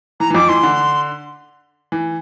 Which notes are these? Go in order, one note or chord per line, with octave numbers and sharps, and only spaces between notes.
E3 A#5
E3
F2 F3 D6
E3 C6
D3
E3